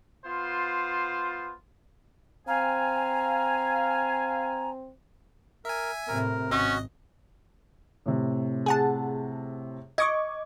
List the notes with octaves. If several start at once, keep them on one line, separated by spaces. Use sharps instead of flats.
B3 F4 C5
C4 F5 G#5 A#5
A#4 E5 G#5
A2 C3 A#4
G#1 C#4 F#4 D#5
A2 C3
G#4 F#5 A5
D#5 C#6 D6 G#6